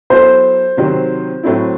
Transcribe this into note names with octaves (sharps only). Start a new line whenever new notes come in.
F#3 B3 E4 A4 C5
C3 D#3 F#3 C4
A2 F#3 A3 C4 E4